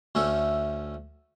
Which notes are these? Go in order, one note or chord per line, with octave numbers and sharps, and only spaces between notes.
D2 A3 C#4 A4